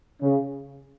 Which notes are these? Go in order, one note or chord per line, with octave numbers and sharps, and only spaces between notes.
C#3